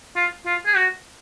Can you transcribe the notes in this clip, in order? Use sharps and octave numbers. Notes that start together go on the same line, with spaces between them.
F4
F4
G#4
F#4